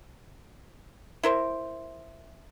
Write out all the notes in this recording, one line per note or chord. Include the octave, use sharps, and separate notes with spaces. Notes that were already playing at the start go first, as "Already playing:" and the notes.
E4 A#4 C5